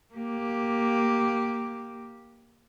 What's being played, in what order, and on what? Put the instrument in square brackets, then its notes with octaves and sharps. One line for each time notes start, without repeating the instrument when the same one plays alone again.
[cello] A#3 G4